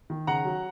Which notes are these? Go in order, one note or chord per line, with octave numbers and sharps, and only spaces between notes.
D#3
C#3 F#5 A#5
F#3